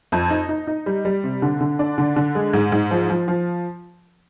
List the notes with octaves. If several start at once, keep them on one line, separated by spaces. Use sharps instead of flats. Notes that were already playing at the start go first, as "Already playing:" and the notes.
F2
D#4
D#4
D#4
G3
G3
C3
D3
D3
D4
D3
D3
G#3
G#2
G#2
F3
F3
F3